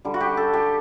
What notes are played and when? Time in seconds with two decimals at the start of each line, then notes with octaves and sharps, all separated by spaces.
0.05 D3 G3
0.14 F#4
0.21 G4
0.37 A4
0.54 G4